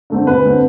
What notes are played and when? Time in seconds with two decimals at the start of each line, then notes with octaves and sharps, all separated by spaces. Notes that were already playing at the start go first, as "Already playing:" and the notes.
0.10 D3 A3 C4
0.27 D2 B4
0.44 D3 A3 C4